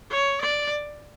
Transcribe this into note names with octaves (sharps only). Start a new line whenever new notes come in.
C#5
D5